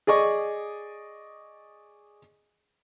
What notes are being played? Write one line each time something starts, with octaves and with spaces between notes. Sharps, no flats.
G#4 D5 D#5 C#6